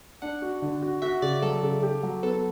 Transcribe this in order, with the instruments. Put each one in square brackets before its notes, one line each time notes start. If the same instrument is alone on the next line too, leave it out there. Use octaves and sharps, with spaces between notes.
[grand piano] D4 [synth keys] F#5
[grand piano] F#4
D3
F#4
[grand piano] F#4 [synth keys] E5
[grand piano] C#3 [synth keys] D5
[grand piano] F#3 [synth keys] A4
[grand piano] C#3
G4
F#3
[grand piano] B3 [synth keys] A4